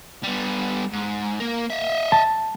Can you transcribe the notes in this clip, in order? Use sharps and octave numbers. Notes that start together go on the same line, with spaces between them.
G3 B3
G#2
A#3 A#4
D#5 E5
A5